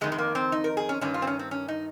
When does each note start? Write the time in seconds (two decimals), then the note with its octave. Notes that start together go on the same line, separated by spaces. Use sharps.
0.01 F2 D#3 G#3
0.12 G#3
0.18 A#3
0.35 C4
0.52 D#4
0.64 A#4
0.77 G#4
0.89 C#4
1.01 G2 D#3 C#4
1.14 F4
1.22 C4
1.27 C#4
1.39 C4
1.51 C#4
1.68 D#4